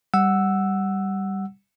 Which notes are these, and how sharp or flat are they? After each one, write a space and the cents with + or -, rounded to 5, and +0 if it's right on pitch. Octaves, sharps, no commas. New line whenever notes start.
G3 +0 F#5 +0 E6 +0